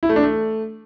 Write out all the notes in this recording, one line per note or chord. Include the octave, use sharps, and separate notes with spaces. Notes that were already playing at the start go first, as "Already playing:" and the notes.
E4
A3
D4
A3